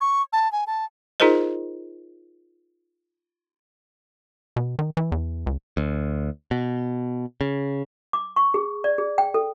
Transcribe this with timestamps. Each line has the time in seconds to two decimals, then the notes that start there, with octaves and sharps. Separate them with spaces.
0.01 C#6
0.33 A5
0.52 G#5
0.67 A5
1.20 D#4 F4 G#4 A#4 C5 D#5
4.56 B2
4.79 D#3
4.97 E3
5.12 E2
5.46 C#2
5.77 D2
6.51 B2
7.41 C#3
8.13 D6
8.36 C#6
8.54 G#4
8.84 D5
8.98 G#4
9.18 G5
9.34 A4